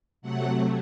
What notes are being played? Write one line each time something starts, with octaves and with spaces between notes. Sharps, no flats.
C3 F#3 A3 F#5